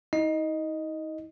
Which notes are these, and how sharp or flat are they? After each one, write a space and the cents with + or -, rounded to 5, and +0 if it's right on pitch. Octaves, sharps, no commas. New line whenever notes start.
D#4 +40 D#5 +0